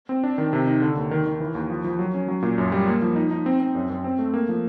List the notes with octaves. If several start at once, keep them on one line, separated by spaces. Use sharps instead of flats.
C4
D4
D#3
C3
D#4
D3
D#2
D#3
D#3
E3
D#2
F3
F3
F#3
C#4
F#3
A#2
F#2
G3
A#3
F3
D#4
D#4
C4
C4
F#2
F#2
C4
A3
A#3
F3